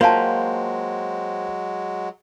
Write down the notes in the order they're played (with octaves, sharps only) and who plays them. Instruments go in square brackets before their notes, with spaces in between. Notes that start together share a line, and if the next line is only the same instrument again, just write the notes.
[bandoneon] F#3 G#3 [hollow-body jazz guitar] A#3 [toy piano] F4 F5 A5 [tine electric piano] C5 G5